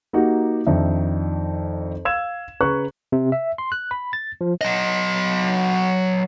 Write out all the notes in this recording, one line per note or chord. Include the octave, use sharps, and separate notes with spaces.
A#3 D#4 F#4 G4
F2 D#3 D4 D#4 E5
F5 E6 G#6 E7
C#3 B4 A#5 C#6 F#6
C3
E5
C6
F#6
B5
A6
F3
F#3 D#5